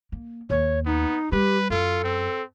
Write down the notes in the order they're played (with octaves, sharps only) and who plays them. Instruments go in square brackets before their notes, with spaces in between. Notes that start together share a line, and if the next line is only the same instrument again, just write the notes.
[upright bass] A#3
[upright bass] D#2 [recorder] C#5
[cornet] B3 [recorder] D#4
[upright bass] G3 [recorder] G4 [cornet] B4
[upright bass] F#2 [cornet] F4 [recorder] A4
[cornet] C4